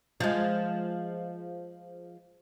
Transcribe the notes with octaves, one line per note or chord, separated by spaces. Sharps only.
F3 G#3